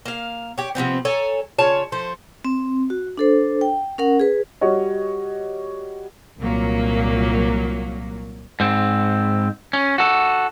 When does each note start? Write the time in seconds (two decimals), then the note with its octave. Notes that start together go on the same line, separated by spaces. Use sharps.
0.05 A#3 F5
0.58 C#4 G4
0.75 C3 F3 B3 C4
1.05 A4 C#5 G#5 A#5
1.59 C#3 F4 C#5 A5
1.92 F3 A3 C5
2.45 C4
2.90 F#4
3.17 D4 A4 C5
3.61 G5
3.98 C#4 A#4 F#5
4.20 G#4 B4
4.61 G3 F#4 C#5 D#5
6.39 C2 A#2 F#3 A#3
8.60 G#2 C4
9.73 C#4
9.98 F#4 A4